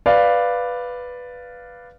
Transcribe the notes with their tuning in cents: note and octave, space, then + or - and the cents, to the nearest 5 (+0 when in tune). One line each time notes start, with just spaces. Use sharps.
B4 +0 D5 +0 F5 +0